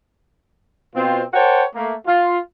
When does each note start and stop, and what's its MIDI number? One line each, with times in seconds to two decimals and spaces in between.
0.95 1.23 47
0.95 1.23 60
0.95 1.23 65
1.33 1.63 70
1.33 1.63 72
1.33 1.63 73
1.33 1.63 78
1.33 1.63 79
1.33 1.63 81
1.75 1.94 57
1.75 1.94 58
2.06 2.38 65